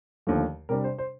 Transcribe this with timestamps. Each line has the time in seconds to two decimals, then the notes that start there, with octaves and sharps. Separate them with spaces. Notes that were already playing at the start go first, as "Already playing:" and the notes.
0.27 D#2 D3 F3 A3
0.69 C3 G3 D4 A#4
0.84 C5
0.98 C5